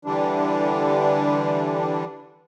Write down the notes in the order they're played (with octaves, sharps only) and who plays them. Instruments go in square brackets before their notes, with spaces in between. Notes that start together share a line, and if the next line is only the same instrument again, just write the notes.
[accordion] D3 E3 G3 D4